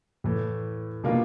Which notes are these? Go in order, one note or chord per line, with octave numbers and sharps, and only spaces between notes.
A2 E3 A3
B2 G3 A#3 D4 F4